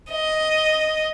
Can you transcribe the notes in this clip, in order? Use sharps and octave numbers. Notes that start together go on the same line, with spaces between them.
D#5